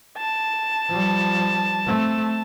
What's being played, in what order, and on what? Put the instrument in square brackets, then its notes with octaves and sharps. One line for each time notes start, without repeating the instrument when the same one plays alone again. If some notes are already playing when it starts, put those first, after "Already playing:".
[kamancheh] A5
[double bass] F3 G3
A3 C4